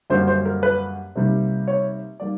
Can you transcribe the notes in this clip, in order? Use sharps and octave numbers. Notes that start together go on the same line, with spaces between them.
F#2 D3 G3 A#3 C5
C5
A#4
B4
C3 D#3 G3 A#3
C#5
D#3 G3 A#3 D5